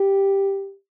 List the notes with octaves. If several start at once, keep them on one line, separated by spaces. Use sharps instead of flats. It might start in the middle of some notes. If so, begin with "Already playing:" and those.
Already playing: G4